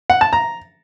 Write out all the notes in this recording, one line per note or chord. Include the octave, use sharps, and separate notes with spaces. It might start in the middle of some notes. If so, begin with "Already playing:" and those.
F#5
A5
A#5